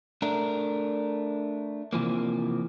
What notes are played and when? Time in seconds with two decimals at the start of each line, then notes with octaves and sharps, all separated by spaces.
0.22 A3 D4 A#4
1.93 C3 E3 F3 A#3